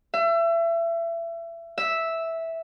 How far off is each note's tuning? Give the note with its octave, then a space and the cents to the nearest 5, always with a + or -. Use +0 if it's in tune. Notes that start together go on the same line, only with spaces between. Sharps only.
E5 +30
E5 -5